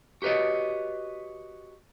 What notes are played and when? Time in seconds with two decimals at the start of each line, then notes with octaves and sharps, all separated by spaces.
0.22 F#4 G4 B4 C#5 D#5